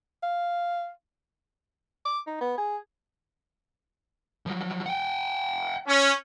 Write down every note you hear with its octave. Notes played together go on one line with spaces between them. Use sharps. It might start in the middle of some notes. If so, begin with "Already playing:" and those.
F5
D6
D#4
B3
G#4
F3 F#3
F#5 G5
C#4